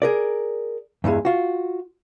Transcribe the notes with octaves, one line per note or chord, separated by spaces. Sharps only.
G#4 A#4 D5
E2 G2 E3 G#3
F4 F#4